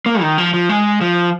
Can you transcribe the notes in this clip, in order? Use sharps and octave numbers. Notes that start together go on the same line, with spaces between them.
A#3
D#3
F3
F3
G#3
F3